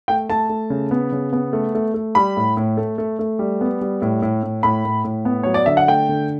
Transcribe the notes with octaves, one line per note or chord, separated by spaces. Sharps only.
A3 G5
A3 A5
A3
C#3
B3
C#3
B3
A3
A3
A3
G3 B5
A2
A2
A3
A3
A3
G3
B3
G3
A2
A2
A2
A2 B5
A2
A2
B3
F#3 C#5
D5
D3 E5
F#5
A3 G5
D3